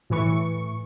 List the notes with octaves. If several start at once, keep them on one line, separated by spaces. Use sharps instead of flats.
A2 E3 C#6